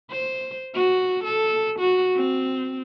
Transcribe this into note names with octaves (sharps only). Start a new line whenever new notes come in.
C5
F#4
A4
F#4
C4